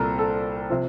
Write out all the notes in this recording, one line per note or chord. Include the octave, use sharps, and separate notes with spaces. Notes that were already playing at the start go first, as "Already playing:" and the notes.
Already playing: C2 A#2 G3 C4 A4 A#4
A4
C3 F3